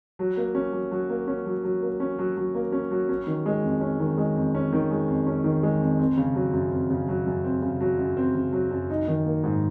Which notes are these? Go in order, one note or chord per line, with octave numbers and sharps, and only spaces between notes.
F#3
A#3
C#4
F#3
F#3
A#3
C#4
F#3
F#3
A#3
C#4
F#3
F#3
A#3
C#4
F#3
C#4
D#3
G#3
F2
C#4
D#3
G#3
F2
C#4
D#3
G#3
F2
C#4
D#3
G#3
F2
C4
C#3
F#3
F#2
C4
C#3
F#3
F#2
C4
C#3
F#3
F#2
C4
C#3
F#3
F#2
D#4
D#3
A#3
G#2